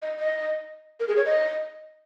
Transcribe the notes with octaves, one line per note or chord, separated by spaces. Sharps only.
D#5
D#5
A#4
G#4
C#5
D#5